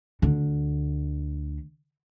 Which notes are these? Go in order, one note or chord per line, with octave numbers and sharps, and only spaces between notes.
D2 D3